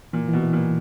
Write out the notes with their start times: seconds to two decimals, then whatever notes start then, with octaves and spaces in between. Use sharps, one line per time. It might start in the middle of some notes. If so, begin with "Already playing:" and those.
0.13 A#2 E3
0.29 B2 E3
0.43 E3
0.53 A#2
0.58 E3